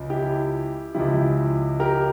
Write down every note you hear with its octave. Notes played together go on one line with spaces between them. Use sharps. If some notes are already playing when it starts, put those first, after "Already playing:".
Already playing: C#2 C#3 F3
E4 G4
C#2 C#3 F3 E4 G4
G4 A#4